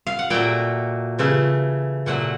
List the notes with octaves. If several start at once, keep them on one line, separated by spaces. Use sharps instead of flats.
F5
F#5
A#2 F#3 A3 G5
C#3 E3 A3
A#2 F#3 A3 F#5